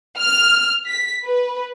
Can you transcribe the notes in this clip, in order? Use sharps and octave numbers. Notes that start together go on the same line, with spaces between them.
F6
B6
B4